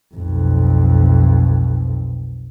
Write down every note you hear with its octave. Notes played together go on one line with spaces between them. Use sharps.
B1 F2